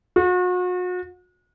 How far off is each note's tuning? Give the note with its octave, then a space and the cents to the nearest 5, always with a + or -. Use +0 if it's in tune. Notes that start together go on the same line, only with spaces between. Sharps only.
F#4 -40